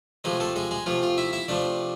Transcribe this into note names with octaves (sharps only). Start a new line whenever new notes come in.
C3 F3 G#3 A3 G#4
A3 A4
G#3 G#4
G#3 G#4
C3 F3 A3 F4
F4
E4 E5
E4 E5
C3 F3 A3 D4 D5